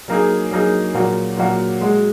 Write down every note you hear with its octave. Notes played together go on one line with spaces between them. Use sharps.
F#3 A#3 D#4 G#4
F#3 A#3 D#4 G#4
A#2 F#3 A#3 F#4
A#2 F#3 A#3 F#4
G#3 F#4